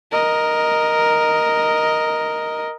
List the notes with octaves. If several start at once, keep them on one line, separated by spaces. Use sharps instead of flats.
A#4 D#5